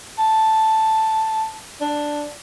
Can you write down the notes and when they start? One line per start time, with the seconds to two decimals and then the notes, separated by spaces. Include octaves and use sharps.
0.18 A5
1.81 D4